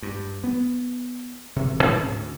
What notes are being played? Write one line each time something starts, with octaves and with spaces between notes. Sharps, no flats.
G2
B3
E1 C3
G#2 C3 C#4 D4
D2